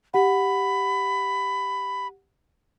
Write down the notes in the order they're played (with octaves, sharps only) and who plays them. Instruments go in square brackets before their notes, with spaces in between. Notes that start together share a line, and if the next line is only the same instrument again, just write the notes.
[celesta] G4 F#5 [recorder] B5